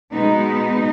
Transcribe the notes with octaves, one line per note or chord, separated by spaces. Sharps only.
B2 G#3 B3 D#4